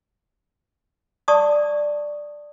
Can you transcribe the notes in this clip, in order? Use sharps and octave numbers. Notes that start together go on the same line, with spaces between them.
D5 A5 C#6 D#6